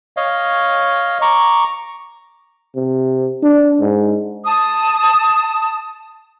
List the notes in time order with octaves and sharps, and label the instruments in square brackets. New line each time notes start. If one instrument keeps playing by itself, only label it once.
[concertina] C#5 D#5 F5
A#5 C#6 D6
[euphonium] C3
D4
G#2
[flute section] A5 D#6